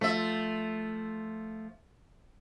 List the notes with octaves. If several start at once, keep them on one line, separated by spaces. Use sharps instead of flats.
F3 A3 E5